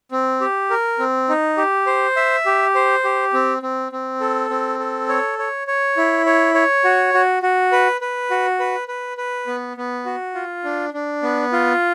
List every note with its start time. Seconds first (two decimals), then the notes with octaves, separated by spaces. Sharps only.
0.11 C4
0.41 G4
0.70 A#4
0.99 C4
1.29 D#4
1.57 G4
1.87 C5
2.17 E5
2.46 G4
2.75 C5
3.04 G4
3.33 C4
3.62 C4
3.92 C4
4.20 A4
4.50 C4
4.79 A4
5.09 C#5
5.39 C#5
5.67 C#5
5.97 E4
6.26 C#5
6.55 C#5
6.85 F#4
7.14 F#4
7.43 F#4
7.72 B4
8.01 B4
8.31 F#4
8.59 B4
8.88 B4
9.17 B4
9.47 B3
9.77 B3
10.05 F#4
10.35 F4
10.64 D4
10.94 D4
11.23 B3
11.52 F4